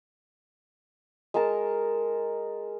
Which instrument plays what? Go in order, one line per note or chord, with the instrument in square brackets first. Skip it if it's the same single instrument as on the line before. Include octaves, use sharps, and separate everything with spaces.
[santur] G#3 A#4 A5